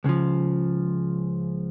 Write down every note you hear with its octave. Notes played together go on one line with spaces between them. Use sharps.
C#2 C#3 F3